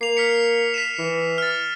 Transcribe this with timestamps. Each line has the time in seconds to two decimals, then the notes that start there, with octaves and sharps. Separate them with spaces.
0.01 A#3 C7 F7
0.17 F6 B6 C#7
0.74 B6 D#7 E7
0.99 E3
1.38 F6 A6